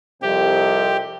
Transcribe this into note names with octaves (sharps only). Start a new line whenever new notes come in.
C2 F2 C3 G4